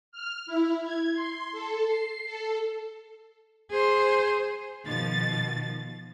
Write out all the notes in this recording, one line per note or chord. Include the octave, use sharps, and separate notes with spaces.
F6
E4
G#6
C6
A4
C7
A4
G#4 C5
B2 D#3 F3 A6